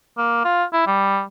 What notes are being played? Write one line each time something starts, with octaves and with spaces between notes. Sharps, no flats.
A#3
F4
E4
G3